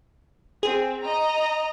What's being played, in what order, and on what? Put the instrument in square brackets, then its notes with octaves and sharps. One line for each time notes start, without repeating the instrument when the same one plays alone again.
[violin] C4 [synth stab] G#4
[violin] D#5 A#5